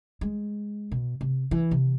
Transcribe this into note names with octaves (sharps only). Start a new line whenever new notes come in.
G#3
B2
C3
E3
C3